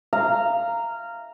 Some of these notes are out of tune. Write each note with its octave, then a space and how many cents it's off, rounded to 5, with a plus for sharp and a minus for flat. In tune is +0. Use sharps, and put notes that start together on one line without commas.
F5 -15 A#5 -10